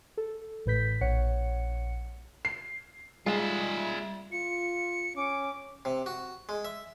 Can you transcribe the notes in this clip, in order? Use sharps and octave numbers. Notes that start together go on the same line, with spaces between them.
A4
A1 A2 B4 G6 B6
A#1 C#5 F#5 C#7
C7
G3 G#3 F4 E5
F4 C#7
C#4 D6
C3
F#4
G#3
E5